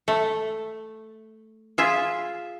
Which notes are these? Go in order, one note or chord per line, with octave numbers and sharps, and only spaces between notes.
A3
F4 G#4 E5